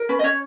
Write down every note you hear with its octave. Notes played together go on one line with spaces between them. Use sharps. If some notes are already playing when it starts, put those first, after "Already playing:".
Already playing: A#4
C#4 B4
D#5
C#4 C#5